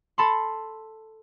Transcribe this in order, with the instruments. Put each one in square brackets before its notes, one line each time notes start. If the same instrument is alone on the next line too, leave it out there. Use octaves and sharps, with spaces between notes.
[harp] A4 A5 B5 C6